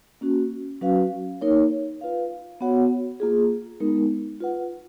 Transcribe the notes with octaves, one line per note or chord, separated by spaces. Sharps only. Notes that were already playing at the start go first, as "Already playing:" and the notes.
A#3 C#4 F#4
F#3 C#4 F#4 B4 F5
A#3 D#4 A#4 C#5
F4 B4 F5
B3 F#4 C#5 F#5
A#3 F4 G#4
G#3 B3 D#4 A#4
F4 B4 F#5